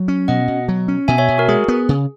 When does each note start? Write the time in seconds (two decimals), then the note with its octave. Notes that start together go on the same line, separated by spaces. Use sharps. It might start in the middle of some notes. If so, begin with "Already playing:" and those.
Already playing: F#3
0.08 C#4
0.28 B2 D#5 F#5
0.48 B2
0.68 F#3
0.88 C#4
1.08 B2 E5 G#5
1.18 C#5 E5
1.29 B2
1.38 F#4 A#4
1.48 G#3 G#4
1.68 B3
1.89 C#3